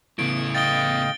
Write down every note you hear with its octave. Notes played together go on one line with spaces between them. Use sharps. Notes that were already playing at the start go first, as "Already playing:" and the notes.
A2 C#3 B3 E4 D7
D#5 F5 G5 A6 G7